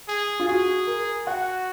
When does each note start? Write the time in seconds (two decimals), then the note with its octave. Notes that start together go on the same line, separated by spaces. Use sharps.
0.08 G#4
0.40 F4
0.48 F#4 G#4
0.87 A#4
1.27 F#4 F#5